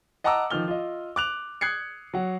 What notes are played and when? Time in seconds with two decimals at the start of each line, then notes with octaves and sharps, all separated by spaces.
0.24 D#5 F#5 A5 A#5 D6 E6
0.50 D#3 F3 F6 G7
0.68 F4 D#5
1.16 D6 F#6 F7
1.61 D#6 F#6 G#6 C7 C#7
2.14 F#3 F#5